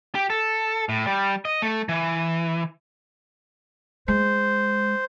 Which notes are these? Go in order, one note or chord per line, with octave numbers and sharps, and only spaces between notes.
G4
A4
A2
G3
D#5
A3
E3
G#3 C5